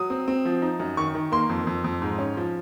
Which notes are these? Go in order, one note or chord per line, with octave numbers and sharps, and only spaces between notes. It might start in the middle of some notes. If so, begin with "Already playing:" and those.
Already playing: F#3 D#6
C4
C4
F3
D#4
F#2
D#3 C#6
D#3
A#3 C6
F2
F2
F2
G#2
C#4
F3